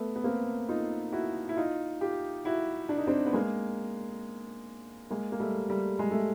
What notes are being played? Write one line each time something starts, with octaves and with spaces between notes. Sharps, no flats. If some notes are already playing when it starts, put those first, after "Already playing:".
Already playing: A3 B3
B3
A#3 C4
D#4 F4
E4 F#4
E4
D#4 F4
F4 G4
E4 F#4
D4
D#4
C4 D4
B3
G#3 A#3
G#3 A#3
A#3
G3 A3
G3 A3
G#3
A3